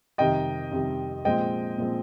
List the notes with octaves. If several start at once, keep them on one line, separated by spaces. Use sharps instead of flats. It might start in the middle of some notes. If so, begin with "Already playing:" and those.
F2 C3 D#3 G3 D#5 G5
F2 C3 D#3 G3
A#2 F3 G#3 C4 D#5 G5
A#2 F3 G#3 C4